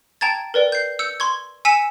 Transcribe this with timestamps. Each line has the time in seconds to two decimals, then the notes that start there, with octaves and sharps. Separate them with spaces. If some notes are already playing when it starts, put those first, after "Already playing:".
0.21 G5 A5 A#5 G#6 A6
0.54 A#4 B4 D5 G5
0.72 G6 C7
0.99 E6 G6 C#7
1.20 C6 C#6 G#6
1.65 G#5 E6 B6 C#7 D#7 E7